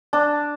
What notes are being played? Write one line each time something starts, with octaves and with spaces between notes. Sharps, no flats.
D4